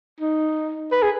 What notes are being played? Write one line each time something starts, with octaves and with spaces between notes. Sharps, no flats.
D#4
B4
G#4